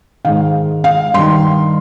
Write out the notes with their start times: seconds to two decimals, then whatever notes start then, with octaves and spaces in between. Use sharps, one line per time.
0.25 G#2 D#3 F5
0.84 F5
1.14 G2 D#3 C6